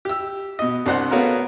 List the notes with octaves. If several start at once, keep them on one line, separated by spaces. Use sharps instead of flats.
G4 E6
B2 D#5
C2 C3 D4 C5 F#5 F#6
A3 B3 C#4 F4 F#4 A#4